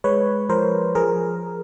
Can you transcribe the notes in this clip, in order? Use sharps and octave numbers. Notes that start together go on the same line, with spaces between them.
G#3 B4 C#5
F3 A#4 C5
F3 G#4 A#4